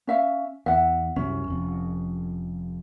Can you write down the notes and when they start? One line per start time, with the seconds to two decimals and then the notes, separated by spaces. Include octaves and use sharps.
0.07 C#4 E5 F5
0.66 E2 E5 F#5
1.16 C2 F#2 F#3 C#4
1.47 F1 F2